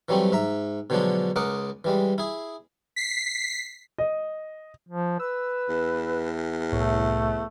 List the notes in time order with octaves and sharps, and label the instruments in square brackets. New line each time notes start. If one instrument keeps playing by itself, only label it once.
[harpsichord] E3 F#3 G3 A3 C4
G#2 E5 A#5
B2 D3 F3 F#3 G#3 D4
C#2 G#3 A#4 F#5 D6 D#6
E3 G3 G#3
E4 G#4
[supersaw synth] B6 C7
[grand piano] D#5
[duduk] F3
[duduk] B4 [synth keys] E6
[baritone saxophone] E2
[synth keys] C2 A2 C#5 [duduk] A3